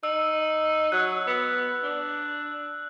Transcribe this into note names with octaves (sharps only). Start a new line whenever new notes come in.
D#4 E6
F#3 F#6
B3
D4